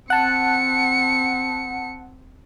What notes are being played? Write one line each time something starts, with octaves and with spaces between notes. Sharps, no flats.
C4 F#5 A5 C#7